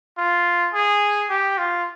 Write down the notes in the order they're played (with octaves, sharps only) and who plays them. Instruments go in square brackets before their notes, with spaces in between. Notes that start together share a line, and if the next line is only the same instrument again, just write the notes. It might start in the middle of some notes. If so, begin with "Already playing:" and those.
[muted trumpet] F4
G#4
G4
F4